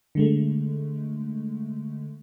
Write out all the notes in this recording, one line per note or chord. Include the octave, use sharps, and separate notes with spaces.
D3 G#3 A3